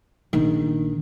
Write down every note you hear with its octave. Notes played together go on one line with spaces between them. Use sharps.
A#1 D#3